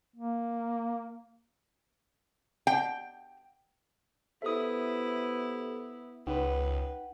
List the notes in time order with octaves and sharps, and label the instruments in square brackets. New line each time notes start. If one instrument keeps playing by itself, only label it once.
[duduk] A#3
[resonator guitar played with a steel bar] G5
[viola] B3 E4 [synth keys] G4 A4 C5 [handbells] E5 D#6
[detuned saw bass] C#2 [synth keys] D#4 F#5 G5 [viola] B4